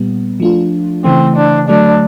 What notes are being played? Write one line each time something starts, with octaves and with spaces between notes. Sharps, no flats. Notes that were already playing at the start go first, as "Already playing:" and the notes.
Already playing: A#2 G3 B3
F3 A3 D4 F4
C#3 E3 A3 C4
D4
D3 F#3 A3 D4